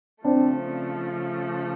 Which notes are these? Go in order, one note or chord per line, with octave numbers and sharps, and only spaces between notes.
C#3 F3 A3 C4 D4